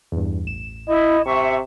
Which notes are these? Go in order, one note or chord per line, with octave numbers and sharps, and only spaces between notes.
E2 G2
A1 E7
E4 D#5
C3 E5 C#6